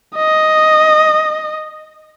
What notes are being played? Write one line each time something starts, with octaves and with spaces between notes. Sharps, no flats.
D#5